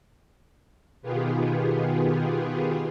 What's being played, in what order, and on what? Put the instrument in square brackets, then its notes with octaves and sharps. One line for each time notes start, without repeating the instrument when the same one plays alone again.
[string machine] B2 D#3 B3 F4 G4 G#4